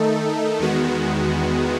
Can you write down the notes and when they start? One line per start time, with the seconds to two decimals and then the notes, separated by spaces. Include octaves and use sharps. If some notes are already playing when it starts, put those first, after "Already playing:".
Already playing: D#3 A3 D#4 A4
0.60 E2 D#3 G#3 B3 F#4